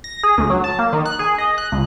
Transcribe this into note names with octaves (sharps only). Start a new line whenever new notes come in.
A#6
G#4
D2
F#3
A5
A#3
D#3
F#6
G#4
D#5
F#6
C#2